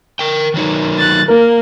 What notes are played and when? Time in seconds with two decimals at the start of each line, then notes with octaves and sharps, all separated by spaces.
0.19 A#4 G5
0.54 D#3 F#3 D#4
0.98 F#6 A6
1.28 A#3 A#4